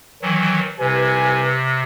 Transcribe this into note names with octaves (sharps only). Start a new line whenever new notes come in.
D#3 E3 F#3
C2 C3 B4 G#5